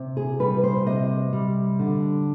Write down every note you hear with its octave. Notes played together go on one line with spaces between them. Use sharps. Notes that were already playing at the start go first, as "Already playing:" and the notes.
Already playing: C3
G#4
G3 B4
C5
C3 D#5
G3
D3